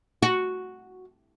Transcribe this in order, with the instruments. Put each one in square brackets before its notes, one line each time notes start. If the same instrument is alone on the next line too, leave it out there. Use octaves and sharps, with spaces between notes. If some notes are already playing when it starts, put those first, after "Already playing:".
[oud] F#4